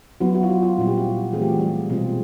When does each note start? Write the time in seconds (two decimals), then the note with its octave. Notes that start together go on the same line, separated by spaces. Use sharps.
0.20 F#3 B3 E4 F#4
0.35 F#4
0.43 F4
0.50 F#4
0.63 F4
0.77 A#2 G3 C4 E4 F#4
0.88 G4
0.98 F#4
1.33 E3 A3 C4 F4 G#4
1.42 G4
1.50 F#4
1.58 G3 G4
1.90 B2 G3 G#3 C4 F4 G#4